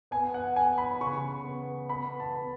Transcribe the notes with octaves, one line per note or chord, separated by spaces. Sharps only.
B3 G#5
F#5
B3 G#5
B5
C#3 C#6
B3
B3 B5
A5
B3